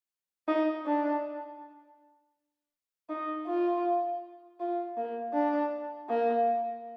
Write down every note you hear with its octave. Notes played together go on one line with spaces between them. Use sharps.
D#4
D4
D#4
F4
F4
A#3
D4
A#3